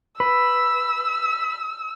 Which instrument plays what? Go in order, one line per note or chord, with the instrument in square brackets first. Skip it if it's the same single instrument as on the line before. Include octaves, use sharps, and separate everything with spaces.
[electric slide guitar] B4 [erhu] E6